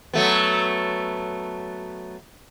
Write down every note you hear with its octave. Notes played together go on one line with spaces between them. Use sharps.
F#3 A3 B3